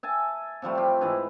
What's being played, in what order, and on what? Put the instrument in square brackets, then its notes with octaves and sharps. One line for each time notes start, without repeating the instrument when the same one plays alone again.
[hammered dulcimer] E5 G#5 A5
C3 F3 G3 A3
F4 G4
G#2 E3 E4 B4